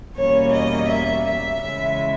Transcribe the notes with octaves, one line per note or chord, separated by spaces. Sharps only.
E2 B2 G3 A#3 C#4 C#5
D#5
E5
E5
C#3 E3 G#3 C#4 E5